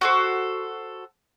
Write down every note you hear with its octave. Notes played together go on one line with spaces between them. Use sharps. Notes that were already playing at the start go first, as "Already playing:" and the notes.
F#4 A4 C5